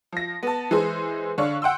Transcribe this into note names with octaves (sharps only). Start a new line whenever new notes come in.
F3 A#6
B3 A5
E3 G#3 G#4 C5
D3 D4 C#5 F5 C#6
F#5 G5 C6 E6